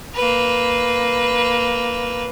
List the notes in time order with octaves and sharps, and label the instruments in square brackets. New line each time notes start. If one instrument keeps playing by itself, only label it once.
[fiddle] A#3 B4